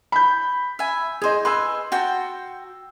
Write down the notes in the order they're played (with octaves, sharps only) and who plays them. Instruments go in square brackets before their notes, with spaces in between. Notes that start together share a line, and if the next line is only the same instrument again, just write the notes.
[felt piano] B5 G6
[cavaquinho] E5 G#5
[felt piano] G#4 D#5 [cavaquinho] C5 G#5
[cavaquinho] B4 D#5 G#5 [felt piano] C6 E6
[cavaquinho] F#4 G5 A5